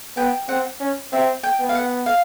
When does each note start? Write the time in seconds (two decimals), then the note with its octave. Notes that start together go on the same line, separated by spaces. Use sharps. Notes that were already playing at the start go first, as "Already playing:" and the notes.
0.17 B3 G5
0.49 C4 F#5
0.80 C#4
1.13 C4 E5
1.43 G5
1.60 B3
1.69 F5
1.75 F#5
2.06 F5